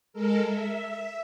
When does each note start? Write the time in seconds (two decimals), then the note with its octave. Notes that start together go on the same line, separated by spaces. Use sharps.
0.13 G#3 A4 A#4
0.47 E5